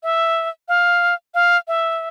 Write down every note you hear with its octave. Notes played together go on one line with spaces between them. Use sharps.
E5
F5
F5
E5